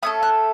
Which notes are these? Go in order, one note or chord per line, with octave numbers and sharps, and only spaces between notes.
A3 C#4 A4 D#6
F#6